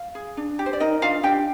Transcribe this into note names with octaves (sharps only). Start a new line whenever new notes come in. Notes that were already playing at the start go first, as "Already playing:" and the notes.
Already playing: F5
G#4
D4
G4
C5
D5
D#4 A#4 D#5
D4 F4 F5
D4 G4 G5